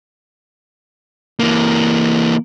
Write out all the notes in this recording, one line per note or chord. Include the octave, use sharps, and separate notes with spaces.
E3 A#3